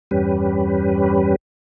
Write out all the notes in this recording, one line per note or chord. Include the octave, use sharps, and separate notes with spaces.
E2 G2 G3 C#4 G4 B4